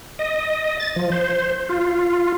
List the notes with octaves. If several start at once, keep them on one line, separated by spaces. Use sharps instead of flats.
D#5
A6
F3
C5
F4